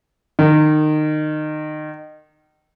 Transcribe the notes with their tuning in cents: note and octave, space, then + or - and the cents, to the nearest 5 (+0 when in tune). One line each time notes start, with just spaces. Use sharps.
D#3 -25